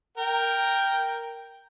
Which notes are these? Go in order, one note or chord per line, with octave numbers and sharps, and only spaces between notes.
A#4 G5